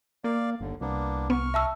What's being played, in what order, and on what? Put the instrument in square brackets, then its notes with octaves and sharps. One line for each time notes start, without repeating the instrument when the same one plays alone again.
[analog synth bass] A#3 [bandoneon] D5 F5
[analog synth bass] G1 [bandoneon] D#2 D3
[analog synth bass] C2 [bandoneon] A#3 B3 D4
[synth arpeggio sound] B3 [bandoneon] C#6 F6
[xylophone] E5 A5 E6